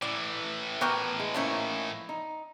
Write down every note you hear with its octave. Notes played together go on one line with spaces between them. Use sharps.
A2 E3 D5
B3 F#4 G4 A#4
G#3
F3 A3 A#3 C#4 D#4 E4
D#4